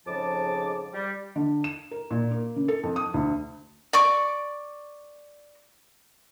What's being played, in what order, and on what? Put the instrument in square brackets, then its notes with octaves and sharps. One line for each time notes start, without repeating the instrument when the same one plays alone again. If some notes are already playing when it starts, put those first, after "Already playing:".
[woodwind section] F2 G#2 C#3 F3 A5 D6
G3
[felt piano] D3
E7
A#4
A#2
A#3
C#3
A4
F2
D#6
D2
[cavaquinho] D5 C#6 D6